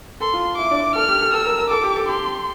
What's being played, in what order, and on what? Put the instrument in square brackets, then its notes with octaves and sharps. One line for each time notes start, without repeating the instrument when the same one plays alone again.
[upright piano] A4 [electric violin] C6
[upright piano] F4
[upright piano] E4 [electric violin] D6
[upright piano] D4
[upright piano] A4 [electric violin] F6
[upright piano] G4
A4
[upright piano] A4 [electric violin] E6
[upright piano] A#4
A#4
[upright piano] A4 [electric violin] D6
[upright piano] G4
A4
[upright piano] G4 [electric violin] C6